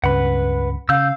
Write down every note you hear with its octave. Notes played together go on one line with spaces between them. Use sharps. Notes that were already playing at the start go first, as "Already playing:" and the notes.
C#2 G2 C#3 B4 F#5 B5
C#3 F5 E6 G6